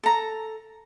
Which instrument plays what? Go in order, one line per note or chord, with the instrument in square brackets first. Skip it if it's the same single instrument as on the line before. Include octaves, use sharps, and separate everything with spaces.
[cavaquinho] A4 A#5